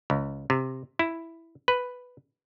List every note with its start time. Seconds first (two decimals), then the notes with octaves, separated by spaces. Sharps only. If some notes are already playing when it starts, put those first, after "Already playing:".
0.10 C#2
0.50 C3
0.99 E4
1.68 B4